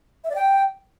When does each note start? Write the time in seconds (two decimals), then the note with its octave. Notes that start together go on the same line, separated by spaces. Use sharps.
0.24 E5
0.30 D5
0.35 G5